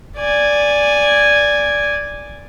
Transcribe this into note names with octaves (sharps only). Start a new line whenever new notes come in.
D5 G#5